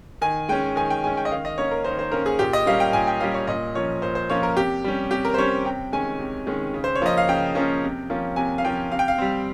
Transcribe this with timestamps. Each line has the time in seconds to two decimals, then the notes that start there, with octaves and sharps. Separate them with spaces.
0.21 D#3 G#5
0.49 G#3 C#4 G5
0.76 D#3 G#5
0.90 G5
1.04 G#3 C#4 G#5
1.17 G5
1.25 D#5
1.31 D#3 F5
1.45 D#5
1.58 A#3 C#4 C#5
1.71 A#4
1.85 D#3 C5
1.99 C5
2.12 A#3 C#4 A#4
2.26 G#4
2.39 A#2 G4
2.53 D#5
2.66 G3 A#3 C#4 F5
2.80 G5
2.93 A#2 G#5
3.07 G5
3.20 G3 A#3 C#4 F5
3.34 C#5
3.47 A#2 D#5
3.75 F3 A#3 C#4 C#5
4.02 A#2 C5
4.15 C5
4.30 F3 A#3 C#4 C#5
4.43 A#4
4.56 C3 G4
4.84 G3 C#4
5.11 C3 G4
5.25 A#4
5.34 C5
5.38 G3 C#4 C#5
5.65 C3 G5
5.92 D#3 G#3 C#4 G#5
6.19 C3
6.47 D#3 G#3 C#4
6.74 C#3
6.84 C5
6.95 C#5
7.01 F3 A#3 C#4 D#5
7.17 F5
7.29 C#3 G5
7.55 F3 A#3 C#4
7.83 C3
8.10 F3 A#3 C#4
8.36 C3 G#5
8.58 F5
8.64 F3 A#3 C#4 G5
8.91 C3 F5
8.99 G5
9.08 F5
9.18 G3 C4